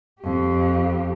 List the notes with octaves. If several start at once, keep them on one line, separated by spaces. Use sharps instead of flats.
F2 G4